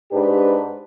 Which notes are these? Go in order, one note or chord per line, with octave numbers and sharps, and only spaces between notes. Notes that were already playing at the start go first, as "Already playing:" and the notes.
G#2 D4 G4 B4